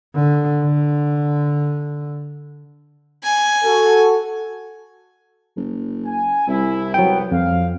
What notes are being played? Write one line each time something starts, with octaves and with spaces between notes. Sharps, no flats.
D3
D3
G#5
F#4 A4
F#1
G#5
C2 E4
F#3 B3 G5
F2 F5